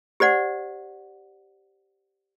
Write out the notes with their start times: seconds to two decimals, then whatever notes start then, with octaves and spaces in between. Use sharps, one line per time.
0.20 G4 C5 D5 F#5